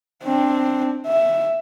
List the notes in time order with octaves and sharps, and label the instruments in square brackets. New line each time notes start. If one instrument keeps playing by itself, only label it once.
[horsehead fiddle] C4 D4
E5